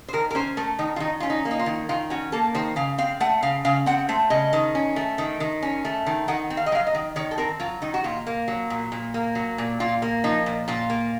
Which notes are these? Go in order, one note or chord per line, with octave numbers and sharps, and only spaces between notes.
C5
D#3 A#4
A#4
C#4 C5
A3 A#4
D#3 D#4
F4
D#3 D#4
C#4 F4
D#4
A#3
D#4
F4
D#3
D#3 F4
C#4 F#4
A#3 A4
D#3 C5
C#3 F5
C4 F5
A3 F#5
C#3 F5
C#3 F5
C4 F#5
A3 C5
C#3 D#5
D#3
C#4
A3
D#3
D#3
C#4
A3
D#3
D#3 F#5
C4
F5
D#5
F#3 F5
D#5
D#3
D#3 C#5
A4
C4 A#4
F#3 F4
D#3 D#4
F#4
A#2 F4
A#3
F#3
A#2
A#2
A#3
F#3
A#2
A#2 F4
A#3
F3 D#4
A#2
A#2 F4
A#3